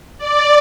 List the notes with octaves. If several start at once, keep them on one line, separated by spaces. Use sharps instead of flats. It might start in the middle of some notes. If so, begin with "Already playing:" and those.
D5